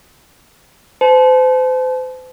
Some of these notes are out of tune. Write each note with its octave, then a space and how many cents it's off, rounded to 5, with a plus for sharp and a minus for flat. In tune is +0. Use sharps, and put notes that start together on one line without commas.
C5 -40 A5 -35